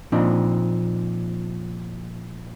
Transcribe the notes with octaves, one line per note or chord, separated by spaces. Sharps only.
A#2 F3 C4 D4 D#4